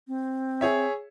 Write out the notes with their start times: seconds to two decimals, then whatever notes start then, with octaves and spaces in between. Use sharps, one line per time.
0.08 C4
0.61 G#4 C#5 E5